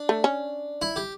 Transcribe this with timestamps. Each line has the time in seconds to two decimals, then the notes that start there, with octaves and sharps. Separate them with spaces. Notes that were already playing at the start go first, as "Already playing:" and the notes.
Already playing: D4
0.09 A3
0.24 C#4
0.82 E4
0.96 G4